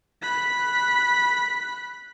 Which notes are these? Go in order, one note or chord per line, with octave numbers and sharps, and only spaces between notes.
B5 F#6